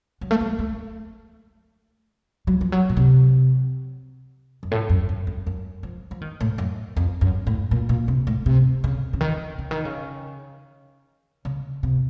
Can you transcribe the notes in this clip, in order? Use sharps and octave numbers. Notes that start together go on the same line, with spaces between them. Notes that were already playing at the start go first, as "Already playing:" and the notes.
F#3
A3
F#3
A3
F#3
F3
F#3
A#2
C3
F#2
A2
F#2
F#2
F#2
F#2
F3
F3
D#3
A2
F#2
F2
F#2
A2
A#2
A#2
C3
A2
C3
C#3
C#3
D#3
C#3
D#3
C#3
C#3
C3